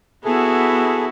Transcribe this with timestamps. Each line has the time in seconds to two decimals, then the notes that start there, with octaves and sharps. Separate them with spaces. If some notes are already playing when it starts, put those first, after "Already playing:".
0.25 B3 E4 F#4 G#4 A4